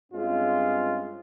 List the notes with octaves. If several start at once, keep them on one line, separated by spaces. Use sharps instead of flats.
G2 G#3 C4 C#4 F4